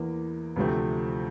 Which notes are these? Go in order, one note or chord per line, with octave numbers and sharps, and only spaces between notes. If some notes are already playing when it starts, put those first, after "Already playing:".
Already playing: E2 E3 A#3 E4
D2 C3 F3 A3 C4